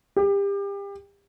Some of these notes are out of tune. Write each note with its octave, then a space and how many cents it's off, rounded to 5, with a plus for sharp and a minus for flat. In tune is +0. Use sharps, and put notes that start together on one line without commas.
G4 +30